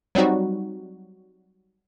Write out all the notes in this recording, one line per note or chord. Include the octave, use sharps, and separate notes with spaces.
F#3 G3 C4 D#4 F#4